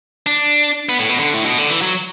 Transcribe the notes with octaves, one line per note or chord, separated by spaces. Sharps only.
D4
B3
A2
B2
D3
A2
B2
D3
E3
F#3